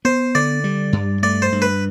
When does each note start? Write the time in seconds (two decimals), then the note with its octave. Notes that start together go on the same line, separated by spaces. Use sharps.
0.05 B3 C5
0.35 D3 D5
0.64 G3
0.93 G2
1.23 A3 D5
1.42 C5
1.52 G2
1.62 B4